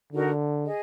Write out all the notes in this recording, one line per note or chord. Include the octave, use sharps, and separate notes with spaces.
D3 D#4 F#4 A#4 D5
G#4 D#5